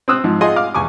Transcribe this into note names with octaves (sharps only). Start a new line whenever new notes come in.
C4 D#6 E6 F#6
G#2 F3
F4 G#4 D#5 F#5 G#5 C6
F5 D6 F6
E2 G#5 C#6 D6